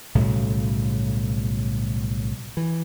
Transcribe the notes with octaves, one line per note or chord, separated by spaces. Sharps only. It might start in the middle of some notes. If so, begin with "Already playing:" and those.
B1 A2 C#3 G3
E3